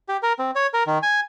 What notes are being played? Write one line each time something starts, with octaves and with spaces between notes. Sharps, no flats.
G4
A#4
C4
C#5
A#4
D#3
G#5